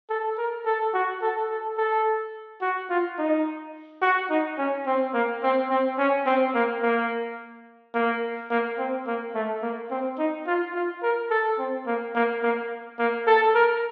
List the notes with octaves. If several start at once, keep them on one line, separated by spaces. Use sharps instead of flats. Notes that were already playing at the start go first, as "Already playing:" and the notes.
A4
A#4
A4
F#4
A4
A4
A4
F#4
F4
D#4
F#4
D#4
C#4
C4
A#3
C4
C4
C#4
C4
A#3
A#3
A#3
A#3
C4
A#3
A3
A#3
C4
D#4
F4
F4
A#4
A4
C4
A#3
A#3
A#3
A#3
A4
A#4